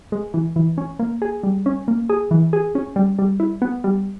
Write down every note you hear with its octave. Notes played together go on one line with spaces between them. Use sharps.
G#3
E3
E3
C#4
A#3
G#4
G3
C#4
A#3
G#4
E3
G#4
C#4
G3
G3
E4
B3
G3